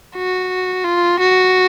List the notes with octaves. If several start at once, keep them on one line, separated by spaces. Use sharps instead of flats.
F#4
F4
F#4